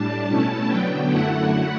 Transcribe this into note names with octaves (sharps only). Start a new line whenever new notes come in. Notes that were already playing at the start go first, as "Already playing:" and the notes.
Already playing: A2 G3 D4 A5
B2 A3 C#4 E4 A5
D3 F#3 B3 D4 G5
F#2 D3 F#3 A3 E4 F#5